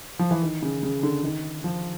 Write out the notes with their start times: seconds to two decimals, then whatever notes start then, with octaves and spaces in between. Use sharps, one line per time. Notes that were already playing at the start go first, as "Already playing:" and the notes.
0.19 F3
0.31 E3
0.43 D#3
0.62 C#3
0.83 C#3
1.03 D3
1.23 D#3
1.64 F3